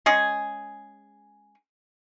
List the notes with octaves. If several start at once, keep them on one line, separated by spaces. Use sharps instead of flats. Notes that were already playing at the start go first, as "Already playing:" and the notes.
G#3 C#4 G#4